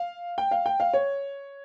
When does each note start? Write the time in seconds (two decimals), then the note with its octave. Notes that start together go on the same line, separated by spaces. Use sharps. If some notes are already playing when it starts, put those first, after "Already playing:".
Already playing: F5
0.38 G5
0.51 F5
0.66 G5
0.80 F5
0.93 C#5